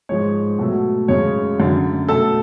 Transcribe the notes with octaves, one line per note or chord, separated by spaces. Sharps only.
G#2 F3 G#3 C#5
B2 F#3 A3
F#2 C#3 G#3 C#5
F#2 D3 F#3
B2 A3 A4